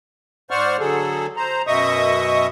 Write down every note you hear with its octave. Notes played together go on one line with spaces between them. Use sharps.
G#2 C5 D5 F#5 C#6 F6
D3 F#3 G#4 A4
C5 A#5
F#2 B2 D#5 E5 C#6 D#6